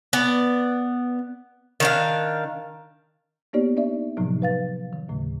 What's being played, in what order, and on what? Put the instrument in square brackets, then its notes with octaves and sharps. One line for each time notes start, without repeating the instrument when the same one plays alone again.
[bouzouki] B3 D5
D#3 D4 F5
[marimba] A#3 B3 D#4 G4 C#5 D5
D4 D#4 D5 E5
A2 C3 F3 F#3 D#4
B4 F5 A6
D#3
D#2 A2 C#3 A3